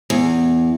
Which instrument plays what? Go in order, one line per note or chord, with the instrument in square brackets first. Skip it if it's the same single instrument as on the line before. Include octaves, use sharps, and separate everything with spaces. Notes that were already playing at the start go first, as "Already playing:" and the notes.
[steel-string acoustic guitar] E2